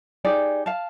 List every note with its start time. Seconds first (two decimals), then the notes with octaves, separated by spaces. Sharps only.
0.25 D#4 G4 G#4 D5
0.66 F5 A5